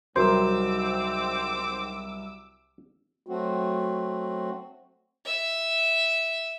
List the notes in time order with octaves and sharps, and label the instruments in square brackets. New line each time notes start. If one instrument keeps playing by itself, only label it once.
[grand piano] C2 F#3 A#4 [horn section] G#2 C4 [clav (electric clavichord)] C5 [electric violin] D6 E6
[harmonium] F#3 A3 C4 F#4
[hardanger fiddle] E5